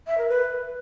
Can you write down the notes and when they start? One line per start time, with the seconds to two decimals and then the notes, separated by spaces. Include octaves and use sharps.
0.06 E5
0.17 A#4
0.28 B4